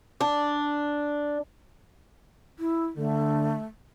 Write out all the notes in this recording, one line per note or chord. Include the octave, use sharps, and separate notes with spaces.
D4
E4
D3 A3